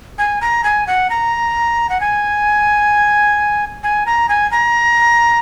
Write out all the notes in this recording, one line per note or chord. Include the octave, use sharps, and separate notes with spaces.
G#5
A#5
G#5
F#5
A#5
F#5
G#5
G#5
A#5
G#5
A#5